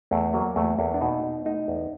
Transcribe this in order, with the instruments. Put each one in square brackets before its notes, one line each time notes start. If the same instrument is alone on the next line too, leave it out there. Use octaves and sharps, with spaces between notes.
[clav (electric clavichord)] E2 A3
F#3 A#3
E2 A3
E2 A#3
D4
B2 D#4
B2
A3 D#4
E2